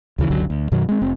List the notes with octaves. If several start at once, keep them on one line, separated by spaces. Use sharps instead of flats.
D2 C#3 E3
F#1 C#2 D3 F#3
D2
F#2 B2 D#3 F#3
G#3 C4
F1 C4